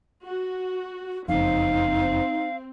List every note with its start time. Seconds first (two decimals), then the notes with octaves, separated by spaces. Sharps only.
0.25 F#4
1.28 F#1 F2 C4 D#4 F5